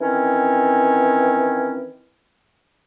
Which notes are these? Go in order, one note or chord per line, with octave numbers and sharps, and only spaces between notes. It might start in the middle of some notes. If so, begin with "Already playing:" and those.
D#3 E3 C4 C#4